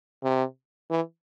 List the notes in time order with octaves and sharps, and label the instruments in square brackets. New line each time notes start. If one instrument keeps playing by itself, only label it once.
[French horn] C3
E3